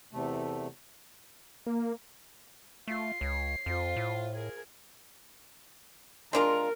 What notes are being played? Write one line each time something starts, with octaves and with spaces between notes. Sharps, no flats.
E2 C3 A3
A#3
A3 F4 C7
C#2 C#5
F2 F4 C5
A2
G#4 A#4 G#6
G#3 D4 F4 A#4